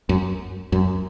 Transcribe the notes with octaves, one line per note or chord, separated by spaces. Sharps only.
F#2
F#2